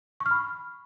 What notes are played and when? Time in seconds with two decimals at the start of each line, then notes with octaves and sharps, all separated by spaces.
0.20 C#6
0.26 F6
0.31 B5